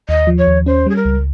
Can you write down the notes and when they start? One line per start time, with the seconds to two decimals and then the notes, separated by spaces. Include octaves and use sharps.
0.09 D#2 D#5
0.27 F3
0.38 C#5
0.47 D#2
0.66 C#4 C5
0.86 G3 G#4
0.96 A#4
1.05 C#2